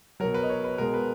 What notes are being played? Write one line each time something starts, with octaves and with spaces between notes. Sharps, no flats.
B2 F#3 A#4
B4
D#5
C#5
B4
B2 G#3 A#4
B4